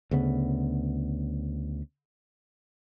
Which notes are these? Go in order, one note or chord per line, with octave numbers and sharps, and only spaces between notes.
D2 C#3 B3